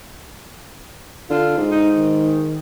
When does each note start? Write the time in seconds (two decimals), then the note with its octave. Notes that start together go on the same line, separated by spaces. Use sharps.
1.30 D3 F4
1.57 G#2
1.71 D#4
1.95 D#3